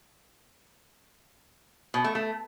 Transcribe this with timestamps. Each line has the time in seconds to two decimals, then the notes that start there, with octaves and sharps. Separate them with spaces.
1.94 B2
2.04 A3
2.15 A3